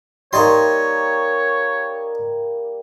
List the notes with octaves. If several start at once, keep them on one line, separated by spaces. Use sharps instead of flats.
G3 A#3 D#4 C#5 D5 C6